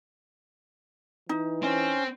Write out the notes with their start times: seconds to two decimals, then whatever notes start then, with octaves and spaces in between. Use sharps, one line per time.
1.29 E3 D#4
1.62 C4 C#4